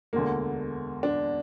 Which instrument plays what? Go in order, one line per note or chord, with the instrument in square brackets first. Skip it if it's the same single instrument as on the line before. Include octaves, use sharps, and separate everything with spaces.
[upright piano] E1 D2 D3 A#3
D4